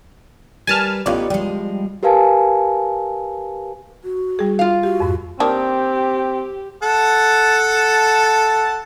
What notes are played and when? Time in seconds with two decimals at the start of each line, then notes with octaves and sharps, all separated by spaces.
0.67 G3 A#4 B4 G#5 A5 F6
1.06 A1 B3 D#4 F4 G4 C#5 D5
1.30 F3 G3 G#3
2.03 G4 A#4 B4 F5 G#5 A5
4.04 F#4
4.39 G3 G#4
4.59 F4 F5
4.83 F#4 G4
5.00 F2 G#2
5.40 D#3 A#3 C4 D4 G4
6.83 A4 F#5 A5